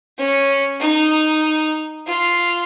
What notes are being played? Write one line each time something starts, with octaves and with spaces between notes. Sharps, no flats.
C#4
D#4
F4